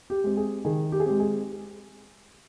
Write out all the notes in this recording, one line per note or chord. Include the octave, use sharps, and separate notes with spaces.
G4
G#3 C4
G#4
D#3 G#4
G4
G#4
G#3 C4 G4
G#4